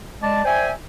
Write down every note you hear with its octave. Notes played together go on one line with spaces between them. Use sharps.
G#3 D5 A5
C5 D5 E5 G5 G#5